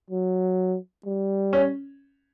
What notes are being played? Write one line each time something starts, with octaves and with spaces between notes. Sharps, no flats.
F#3
G3
C#4